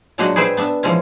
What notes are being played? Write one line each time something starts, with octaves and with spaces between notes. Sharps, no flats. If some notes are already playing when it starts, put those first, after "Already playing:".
A#2 F#3 G#3 D4 F#4 D#5
G#4 B4 C5 E5 G5
B3 D4 E5
E3 F3 G#3 C#4